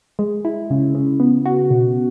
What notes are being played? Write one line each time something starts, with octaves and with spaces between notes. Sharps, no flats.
G#3
E4
C#3
C#3
B3
F#4
B2